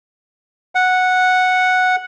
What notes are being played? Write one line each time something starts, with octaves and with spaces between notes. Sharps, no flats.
F#5